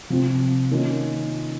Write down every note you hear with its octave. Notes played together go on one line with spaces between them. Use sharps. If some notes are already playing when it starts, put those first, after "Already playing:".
C3 F3 C4 F4
D#3 A#3 C#4 F4